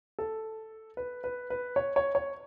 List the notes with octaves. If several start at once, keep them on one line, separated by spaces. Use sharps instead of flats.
A4
B4
B4
B4
C#5
C#5
C#5